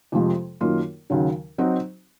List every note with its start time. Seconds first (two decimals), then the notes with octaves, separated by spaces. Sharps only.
0.12 F2 C3 F3 G#3
0.61 F#2 D#3 A#3 F4
1.10 D#2 C#3 F#3
1.58 F#3 C4 D#4 F#4